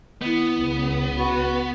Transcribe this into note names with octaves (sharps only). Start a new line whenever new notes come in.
D#3 B3 E4
C#2
F#4 B4